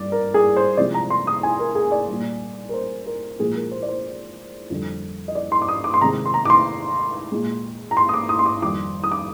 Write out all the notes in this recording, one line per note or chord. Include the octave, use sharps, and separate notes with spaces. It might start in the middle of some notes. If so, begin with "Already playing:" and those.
Already playing: G2 D5
A#4
G#4
C5
C3 F3 G#3 D5
A#5
C6
D#6
G#5
A#4
G#4
D5
A#2 G3
A#4
C5
A#4
A#2 F3 G#3 G#4
A#4
C5
D5
C5
F2 D3 G3
D#5
D5
C6
D6
D#6
D6
C6
C3 D#3 G#3 A#5
C6
A#5
D6
C6
A#2 G#3
A#5
C6
D#6
D6
D#6
C6
D6
F2 D#3 G3 D6
D#6
D6